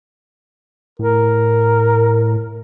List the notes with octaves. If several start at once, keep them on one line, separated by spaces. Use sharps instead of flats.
A2 A#4